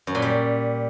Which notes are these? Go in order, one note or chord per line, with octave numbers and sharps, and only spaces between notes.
F#2
A#2
G3